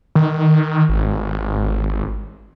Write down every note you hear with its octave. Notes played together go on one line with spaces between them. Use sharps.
D#3
G#1